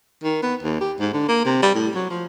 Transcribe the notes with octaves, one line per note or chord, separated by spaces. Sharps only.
D#3
B3
D#2
G4
G#2
D3
A#3
C3
G3
A2
F#3
F3